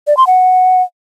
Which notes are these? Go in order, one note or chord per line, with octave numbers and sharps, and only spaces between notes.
D5
C6
F#5